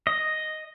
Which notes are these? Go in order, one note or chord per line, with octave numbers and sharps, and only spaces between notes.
D#5